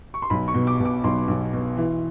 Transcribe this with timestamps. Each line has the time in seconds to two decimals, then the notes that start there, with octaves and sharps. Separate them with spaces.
0.14 C#6
0.22 C6
0.30 B1 B5
0.48 C#6
0.54 B2
0.67 D6
0.80 B2
0.85 D6
1.04 B1 C6
1.28 B1
1.53 B2
1.77 E3